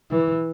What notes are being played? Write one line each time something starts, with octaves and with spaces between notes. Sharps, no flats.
E3